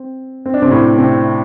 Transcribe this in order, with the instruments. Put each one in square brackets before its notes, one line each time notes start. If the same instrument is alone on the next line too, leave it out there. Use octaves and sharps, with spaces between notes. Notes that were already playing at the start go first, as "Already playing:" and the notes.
Already playing: [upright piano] C4
C4
D4
C3 C4
A2 A3
C3 C4